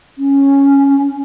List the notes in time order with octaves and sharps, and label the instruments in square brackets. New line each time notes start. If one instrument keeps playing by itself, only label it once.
[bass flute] C#4